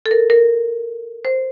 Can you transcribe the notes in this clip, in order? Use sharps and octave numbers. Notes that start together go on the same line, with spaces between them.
A4
A#4
A#4
C5